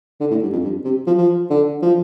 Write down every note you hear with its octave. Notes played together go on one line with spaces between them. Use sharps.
D3
A2
G2
F2
G2
C3
F3
F3
D3
F3